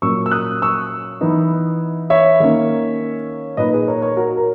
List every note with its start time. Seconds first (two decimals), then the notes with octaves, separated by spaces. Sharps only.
0.02 A#2 F#3 A#3 C#4 C#6 E6
0.26 E6
0.31 D#6 F#6
0.62 C#6 E6
1.21 E3 B3 D#4
2.10 C#5 E5
2.40 D#3 A#3 C#4
3.57 A#2 A#3 D#4 B4 D#5
3.72 G#4 B4
3.88 A#4 C#5
4.02 A#4 C#5
4.17 F#4 A#4
4.37 A#4